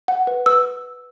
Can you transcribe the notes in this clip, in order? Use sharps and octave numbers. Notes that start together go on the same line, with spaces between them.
F#5
B4
B4 E6